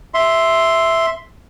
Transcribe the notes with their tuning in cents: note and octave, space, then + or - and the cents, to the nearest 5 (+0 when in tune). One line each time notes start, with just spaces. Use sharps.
E5 +0 C6 +0